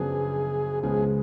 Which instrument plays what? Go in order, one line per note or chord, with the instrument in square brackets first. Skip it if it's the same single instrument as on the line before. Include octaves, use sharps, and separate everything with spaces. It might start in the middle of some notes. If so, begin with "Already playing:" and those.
Already playing: [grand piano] F#2 C#3 F3 B3 D4 [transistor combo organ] G#4
[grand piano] C#2 C#3 F3 G#3 B3 [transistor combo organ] G#4